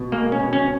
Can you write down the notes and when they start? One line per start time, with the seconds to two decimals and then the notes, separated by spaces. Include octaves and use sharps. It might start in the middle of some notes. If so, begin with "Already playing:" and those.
Already playing: B2
0.12 G#3 A#3
0.32 C#4
0.40 B2
0.53 C#4